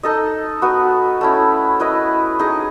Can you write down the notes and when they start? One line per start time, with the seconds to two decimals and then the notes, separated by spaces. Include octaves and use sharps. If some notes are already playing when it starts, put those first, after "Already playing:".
0.03 D#4 A4 D#5
0.62 B3 F#4 B4
1.21 A3 C#4 E4
1.80 E4 B4 D#5
2.39 D#4 G#4 D#5